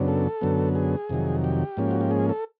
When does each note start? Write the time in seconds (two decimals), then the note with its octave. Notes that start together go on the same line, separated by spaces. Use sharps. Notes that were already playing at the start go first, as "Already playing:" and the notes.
Already playing: F#2 C#3 F#3 B3 D4
0.08 A4
0.41 F#2 D3 F#3 B3
0.75 G#4
1.09 F2 C3 D#3 F#3
1.44 G4
1.77 G#2 F3 A#3 C#4
1.91 F#4
2.01 G4
2.11 G#4
2.29 A4